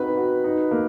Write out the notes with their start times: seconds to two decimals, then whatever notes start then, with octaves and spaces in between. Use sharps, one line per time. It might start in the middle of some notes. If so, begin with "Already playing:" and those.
Already playing: C4 D#4 F#4 B4
0.17 F#4
0.44 D#4
0.71 A#3